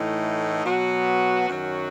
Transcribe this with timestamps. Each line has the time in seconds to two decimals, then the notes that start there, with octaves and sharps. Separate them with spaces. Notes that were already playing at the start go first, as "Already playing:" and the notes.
Already playing: A2 E3 A3 D#4
0.65 B2 F#3 B3 F#4
1.48 F#2 D#3 F#3 C#4 F#4